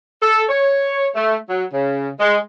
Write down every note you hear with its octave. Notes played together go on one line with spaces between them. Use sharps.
A4
C#5
A3
F#3
C#3
G#3